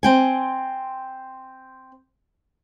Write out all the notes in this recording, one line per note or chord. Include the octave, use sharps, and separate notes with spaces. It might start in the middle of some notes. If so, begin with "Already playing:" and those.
C4 G5 G#5